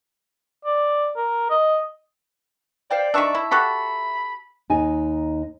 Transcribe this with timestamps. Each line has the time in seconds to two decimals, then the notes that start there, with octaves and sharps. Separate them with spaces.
0.65 D5
1.16 A#4
1.50 D#5
2.90 C5 D5 F5 G5
3.14 D#3 D4 E5 A5 C#6
3.35 E4
3.51 F#4 G4 A4 B5
4.70 D#2 D#4 G#5